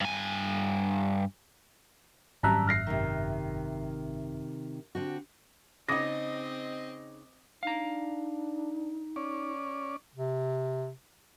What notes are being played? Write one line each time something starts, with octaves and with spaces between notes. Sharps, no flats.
G2 G#5
G#1 F#2 G3 E5 A5 A#5 F#6
F6 A#6 C7
C3 D#3
D3 C4 F#4
C#3 C4 D#4 D#5 D6 D#6 A#6
D4 D#4 F5 A#5
C#4 D5
C3